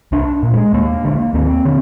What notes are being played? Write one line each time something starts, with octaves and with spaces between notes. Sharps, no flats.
C2 D4
A#2
G#3
D#2 A#3
D3
D#2 C4
D3